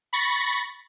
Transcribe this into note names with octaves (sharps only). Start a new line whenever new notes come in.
B5 C#6 A6 A#6